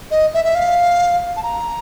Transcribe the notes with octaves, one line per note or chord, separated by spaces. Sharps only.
D#5
E5
E5
F5
A5
A#5